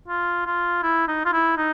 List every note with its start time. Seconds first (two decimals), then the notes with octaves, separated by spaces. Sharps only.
0.09 F4
0.46 F4
0.83 E4
1.08 D#4
1.26 F4
1.33 E4
1.58 D#4